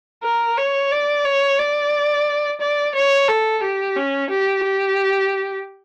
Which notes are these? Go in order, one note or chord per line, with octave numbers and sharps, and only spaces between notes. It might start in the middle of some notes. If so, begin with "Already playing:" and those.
A#4
C#5
D5
C#5
D5
D5
C#5
A4
G4
C#4
G4
G4